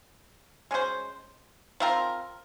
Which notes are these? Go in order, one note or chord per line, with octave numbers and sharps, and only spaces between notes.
G#3 C#4 F#4 C5
F3 C4 F4 A#4